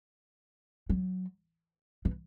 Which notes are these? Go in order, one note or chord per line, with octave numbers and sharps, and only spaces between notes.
F#3
E3